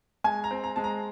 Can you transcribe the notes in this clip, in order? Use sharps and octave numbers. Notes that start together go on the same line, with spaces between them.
G#3 G#5
A#5
C4
A#5
G#3 A5
A#5